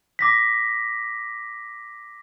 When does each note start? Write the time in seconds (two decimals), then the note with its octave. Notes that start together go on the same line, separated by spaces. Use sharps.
0.19 D6 A#6 B6